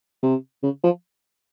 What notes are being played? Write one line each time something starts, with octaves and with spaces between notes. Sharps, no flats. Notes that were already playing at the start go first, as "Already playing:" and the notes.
C3
C#3
F3